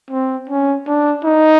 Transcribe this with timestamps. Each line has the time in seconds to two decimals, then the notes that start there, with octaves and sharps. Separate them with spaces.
0.10 C4
0.49 C#4
0.87 D4
1.24 D#4